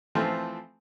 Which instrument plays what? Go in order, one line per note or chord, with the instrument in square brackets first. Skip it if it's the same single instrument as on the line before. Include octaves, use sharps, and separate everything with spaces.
[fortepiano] E3 F3 A3 C4 F4